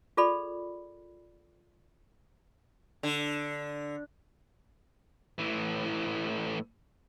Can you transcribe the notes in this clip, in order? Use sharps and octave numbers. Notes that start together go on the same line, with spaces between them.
F4 G#4 A4 D5 B5
D3
A2 E3